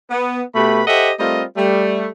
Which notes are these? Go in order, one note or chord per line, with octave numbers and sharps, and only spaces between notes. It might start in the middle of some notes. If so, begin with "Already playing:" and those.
B3
B2 A3 G4 B4 B5
G4 A4 C5 D#5 E5 F#5
G3 A3 C4 F4 A#4 D#5
G3 A3